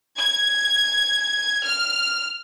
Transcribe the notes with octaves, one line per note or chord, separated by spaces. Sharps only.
G#6
F6